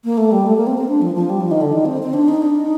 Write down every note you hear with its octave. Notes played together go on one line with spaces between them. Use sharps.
A#3
A3
G3
A3
A#3
C4
C4
D4
F3
F3
G3
F3
D#3
D3
D#3
C4
C4
D4
D#4
D4
D#4